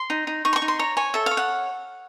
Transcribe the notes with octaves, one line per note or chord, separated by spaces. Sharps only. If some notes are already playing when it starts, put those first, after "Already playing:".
Already playing: C6
D#4
D#4
D#4 C#6
C6
C#6
D#4
C6
C#5 A#5
C#5 G#5
A4 E5
C#5 F5
F#5